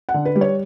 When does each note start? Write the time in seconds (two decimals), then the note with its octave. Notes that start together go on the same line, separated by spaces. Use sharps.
0.09 F#5
0.14 D3
0.25 B4
0.35 G3
0.41 C#5